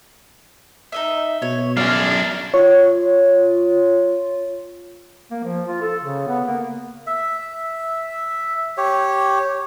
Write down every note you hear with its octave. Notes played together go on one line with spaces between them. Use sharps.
D#4 D#5 E5
B2 C#5
F#2 D4 G#4 F5
F4 C#5
A#3
F3
F4
A4
C#3
B3
A#3
E5
G4 C#5